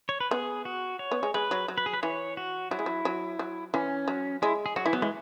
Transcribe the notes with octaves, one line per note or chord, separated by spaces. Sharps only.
C#5
B4
B3 G#4
F#4
C#5
B3
G#3
G#3 B4
F#3
F#3
B4
G#4
B4
E3 C#5
F#4
F#3 E4
G#3
F#3
F#3
F#3
E3 C#4
F#3
G#3 E4
G#4
F#3 F#4
E3 E4
F#3 B3
E3 G#3